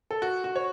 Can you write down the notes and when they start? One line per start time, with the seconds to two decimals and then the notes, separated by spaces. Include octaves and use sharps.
0.11 A4
0.22 F#4
0.44 F#4
0.56 C#5